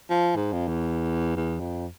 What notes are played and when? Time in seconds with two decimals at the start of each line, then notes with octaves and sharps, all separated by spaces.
0.10 F3
0.36 G#2
0.53 F2
0.68 E2
1.36 E2
1.60 F2